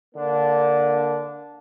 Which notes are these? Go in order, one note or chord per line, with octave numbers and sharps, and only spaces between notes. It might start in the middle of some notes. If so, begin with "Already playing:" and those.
D3 A#3 D4